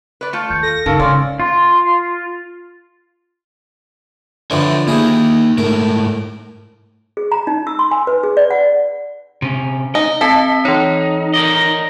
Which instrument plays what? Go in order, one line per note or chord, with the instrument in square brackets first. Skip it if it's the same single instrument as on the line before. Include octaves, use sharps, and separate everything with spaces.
[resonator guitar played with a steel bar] B4 D5
A3 F4
[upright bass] D#2 [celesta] F6 G6 C#7
[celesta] A4 [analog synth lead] A#6
[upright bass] G2 [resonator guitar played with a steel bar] C#3 [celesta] D#4 A#4 F5 [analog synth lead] A4
[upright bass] G#2 C#3 [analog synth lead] C#4 [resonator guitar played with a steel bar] D5 [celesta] F5 C6 F6
[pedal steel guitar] F4
[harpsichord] D3 E3 F3 [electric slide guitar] C#5 E5
[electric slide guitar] A#3 D#4 [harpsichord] E4 G#4
[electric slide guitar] G#2 A3 [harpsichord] A#4
[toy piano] G#4
A#5
D#4
E6
C6
G#5
B4
G#4
D5
F#5
[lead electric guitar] C3 C#4
[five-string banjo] D#4 [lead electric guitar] D#5
[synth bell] C4 A5 B6 [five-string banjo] A4
[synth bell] E3 C#5 [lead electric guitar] D#4
[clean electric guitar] A#4 D5 D#5